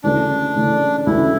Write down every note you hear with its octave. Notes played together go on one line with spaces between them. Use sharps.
D2 C#3 E3 A3 D4
D2 C#3 E3 A3
D2 C#3 E3 A3 E4